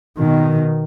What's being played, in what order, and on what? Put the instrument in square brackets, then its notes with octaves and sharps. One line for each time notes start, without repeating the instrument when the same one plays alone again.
[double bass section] B2 D#3